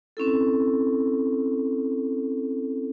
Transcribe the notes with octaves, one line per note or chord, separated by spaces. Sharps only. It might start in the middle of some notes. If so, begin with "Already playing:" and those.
C4 C#4 E4 A4